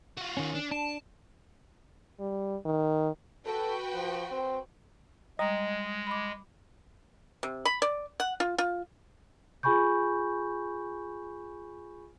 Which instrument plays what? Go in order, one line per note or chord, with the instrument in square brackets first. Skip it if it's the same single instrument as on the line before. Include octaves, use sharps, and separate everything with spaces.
[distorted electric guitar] F4 F#4
[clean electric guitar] D#3 C#4
[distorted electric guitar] D4
[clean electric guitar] D4 [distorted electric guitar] A5
[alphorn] G3
D#3
[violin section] F#4 B4 G5 [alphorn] A4
[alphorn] F3
C4
[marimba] G3 A#5 [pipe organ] G#3 [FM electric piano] D#5
[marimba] B5 D6
[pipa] C3
B5
D5
F#5
F4
F4
[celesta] F4 G#4 G#5 B5 C#6 G6